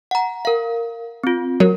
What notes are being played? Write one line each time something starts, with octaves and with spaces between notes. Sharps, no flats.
F#5 A#5
A#4 F5
C4 F4
F#3 A#4